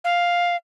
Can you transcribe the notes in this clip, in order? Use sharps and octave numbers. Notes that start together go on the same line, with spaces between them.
F5